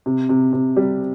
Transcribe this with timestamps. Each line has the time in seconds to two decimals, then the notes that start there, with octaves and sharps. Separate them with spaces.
0.06 C3
0.29 C3
0.53 C3
0.76 G3